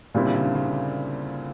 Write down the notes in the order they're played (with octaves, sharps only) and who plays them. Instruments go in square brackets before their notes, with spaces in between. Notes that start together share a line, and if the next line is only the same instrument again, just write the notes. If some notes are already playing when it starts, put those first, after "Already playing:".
[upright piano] A#2 G3 C4 E4 [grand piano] C#3
[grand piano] D3
C#3
D3
C#3
D3